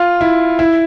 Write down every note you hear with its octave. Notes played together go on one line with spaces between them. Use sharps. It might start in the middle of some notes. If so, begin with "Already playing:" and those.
Already playing: F4
E4
E4